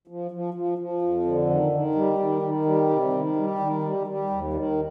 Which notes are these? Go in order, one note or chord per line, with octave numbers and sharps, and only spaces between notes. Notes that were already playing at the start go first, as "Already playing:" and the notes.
F3
F3
F3
F3
F2
D3
D#3
D#3
G3
D#3
D#3
G3
C3
D#3
G3
D#3
G3
G3
D#2
D#3